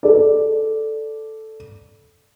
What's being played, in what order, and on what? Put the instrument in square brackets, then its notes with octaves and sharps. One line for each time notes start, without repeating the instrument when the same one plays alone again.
[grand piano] A4 D5